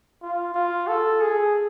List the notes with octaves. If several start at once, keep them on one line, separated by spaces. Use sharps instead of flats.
F4
F4
A4
G#4